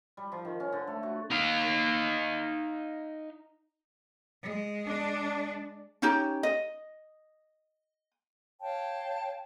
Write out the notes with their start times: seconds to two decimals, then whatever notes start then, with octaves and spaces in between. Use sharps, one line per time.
0.17 G3
0.32 F3
0.45 D#3
0.60 C#4
0.72 D3
0.87 A3
1.03 F#4
1.30 D#4 F5
4.43 G#3
4.86 D4
6.02 C#4 D#4 G4
6.43 D#5
8.61 C#5 F5 G5 A5